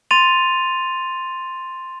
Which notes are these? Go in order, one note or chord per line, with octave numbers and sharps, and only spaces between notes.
C6 A6 D#7 F7